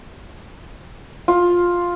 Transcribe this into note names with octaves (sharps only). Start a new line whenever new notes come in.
F4